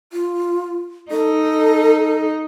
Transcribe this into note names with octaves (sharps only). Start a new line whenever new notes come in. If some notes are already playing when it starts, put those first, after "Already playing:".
F4
D#4 A4